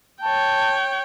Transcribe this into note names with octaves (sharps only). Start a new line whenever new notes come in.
C#5 G5 A5